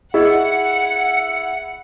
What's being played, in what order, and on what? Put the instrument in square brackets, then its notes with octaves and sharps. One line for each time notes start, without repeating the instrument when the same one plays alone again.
[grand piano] E4 [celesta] G#4 D#5 [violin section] F#5 C#7